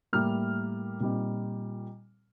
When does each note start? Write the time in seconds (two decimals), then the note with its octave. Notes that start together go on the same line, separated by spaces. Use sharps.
0.13 A2 G3 A#3 F6
1.00 A#2 G3 C4 D#4